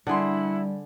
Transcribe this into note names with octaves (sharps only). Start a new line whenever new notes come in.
D3 G3 E4 G#4 F#5 C6